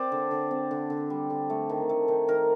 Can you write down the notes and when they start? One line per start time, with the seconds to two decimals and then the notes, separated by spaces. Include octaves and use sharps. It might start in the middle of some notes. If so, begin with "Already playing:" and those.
Already playing: C4 C5 D5
0.12 D3
0.31 D3
0.51 C4
0.71 D3
0.90 D3
1.10 G3
1.30 D3
1.50 A3
1.69 D#3
1.89 A3
2.08 D#3
2.28 D#3 A#4